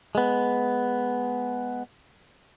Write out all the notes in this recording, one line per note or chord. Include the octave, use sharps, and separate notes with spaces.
G#3 B3